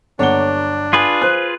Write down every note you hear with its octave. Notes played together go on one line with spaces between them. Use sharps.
G1 F#3 A#3 D4 C#5 F#5 G7
F4 G#4 B4 G#5
C5 F#6